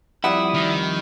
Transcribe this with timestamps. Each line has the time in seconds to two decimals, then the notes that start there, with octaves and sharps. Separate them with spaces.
0.24 F2 G3 E4 D5 F#5 D#6
0.54 D#3